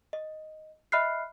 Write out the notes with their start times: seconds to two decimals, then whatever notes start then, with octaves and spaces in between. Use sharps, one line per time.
0.13 D#5
0.92 D#5 E5 B5 F6 F#6 C7